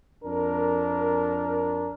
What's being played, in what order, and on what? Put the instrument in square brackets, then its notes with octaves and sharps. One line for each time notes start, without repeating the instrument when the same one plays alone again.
[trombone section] F2 D4 A#4